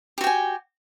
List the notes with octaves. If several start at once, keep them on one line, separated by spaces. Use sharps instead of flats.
F#4 G4 G5 G#5